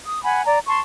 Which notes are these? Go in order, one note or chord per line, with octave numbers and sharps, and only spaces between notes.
D#6
F#5 G#5 B5
D5 A#5
A5 C6 C#6